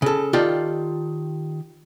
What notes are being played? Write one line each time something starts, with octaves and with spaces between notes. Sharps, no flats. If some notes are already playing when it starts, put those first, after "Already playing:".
C#3 A4
D#3 F4 G4 A4 D5